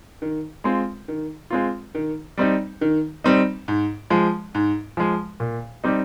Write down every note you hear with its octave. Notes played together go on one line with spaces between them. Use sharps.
D#3
G#3 C4 F4
D#3
G#3 C4 F4
D#3
G3 C4 D#4
D#3
G3 C4 D#4
G#2
F3 G#3
G#2
F3 G#3
A#2
G3 C4 D#4 G4